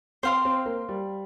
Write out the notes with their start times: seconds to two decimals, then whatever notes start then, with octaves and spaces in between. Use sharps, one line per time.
0.23 C4 C5 F5 C6
0.45 C4
0.66 A#3
0.89 G3